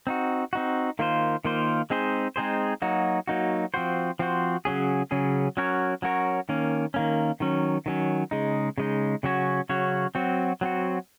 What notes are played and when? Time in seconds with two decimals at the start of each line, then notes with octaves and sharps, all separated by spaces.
0.07 C4 D#4 F#4
0.53 C4 D#4 F#4
0.99 D#3 A#3 F4 C5
1.45 D#3 A#3 F4 C5
1.90 G#3 C4 D#4 G#4 C5
2.36 G#3 C4 D#4 G#4 C5
2.82 F#3 A#3 D#4 F#4
3.27 F#3 A#3 D#4 F#4
3.74 F3 C4 F#4 C5
4.19 F3 C4 F#4 C5
4.65 C#3 F#3 C#4 G#4
5.11 C#3 F#3 C#4 G#4
5.57 F#3 C#4 F#4 A#4 C#5
6.02 F#3 C#4 F#4 A#4 C#5
6.49 D#3 A#3 C#4
6.94 D#3 A#3 C#4
7.40 D#3 F#3 C#4
7.86 D#3 F#3 C#4
8.31 C#3 G#3 D#4
8.78 C#3 G#3 D#4
9.23 C#3 F#3 C#4 F#4 C#5
9.69 C#3 F#3 C#4 F#4 C#5
10.15 F#3 C4 F#4
10.61 F#3 C4 F#4